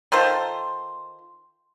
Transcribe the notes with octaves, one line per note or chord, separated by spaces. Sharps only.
D#3 F4 A4 C5